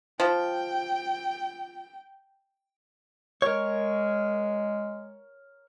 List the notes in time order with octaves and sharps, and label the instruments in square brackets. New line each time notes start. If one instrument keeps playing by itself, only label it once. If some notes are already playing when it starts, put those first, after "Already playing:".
[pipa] F3 [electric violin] G5
[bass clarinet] G#3 [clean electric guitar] A#4 C#5